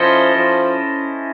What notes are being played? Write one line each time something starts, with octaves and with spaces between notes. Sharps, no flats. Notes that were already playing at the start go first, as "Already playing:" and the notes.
Already playing: F3 C#4 E4 A4 C5 D#5
F3